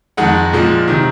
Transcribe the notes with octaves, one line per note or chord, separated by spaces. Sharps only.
F2 D#3 G#3 F#5
A#2 F3 G#3
C3 D#3